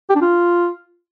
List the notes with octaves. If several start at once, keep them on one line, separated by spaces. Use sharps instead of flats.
G4
D4
F4